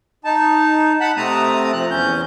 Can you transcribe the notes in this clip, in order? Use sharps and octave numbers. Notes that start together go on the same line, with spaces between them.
D#4 A5
F#5 A5 B5
C3 A3 C4 A5 A#5 D#6
F3 F#6
E2 C#4 G6